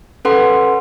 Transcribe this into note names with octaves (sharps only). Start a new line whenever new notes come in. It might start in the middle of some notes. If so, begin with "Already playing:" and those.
C#4 A4 B4 F#5 C6